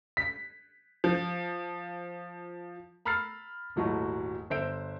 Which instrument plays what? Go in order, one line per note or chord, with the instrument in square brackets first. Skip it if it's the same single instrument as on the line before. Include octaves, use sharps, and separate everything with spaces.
[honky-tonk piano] B6
F3
[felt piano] A#5 B5 E6 F6 A6 C7
D#1 G#2 F#3 A3 E4 F#4
G1 C5 E5 E6 G6 D7